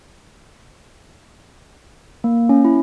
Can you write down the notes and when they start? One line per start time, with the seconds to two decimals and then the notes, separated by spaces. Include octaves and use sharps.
2.24 A#3
2.49 C#4
2.65 E4